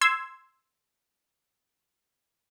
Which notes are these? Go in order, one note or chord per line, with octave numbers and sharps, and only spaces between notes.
C6 E6 G#6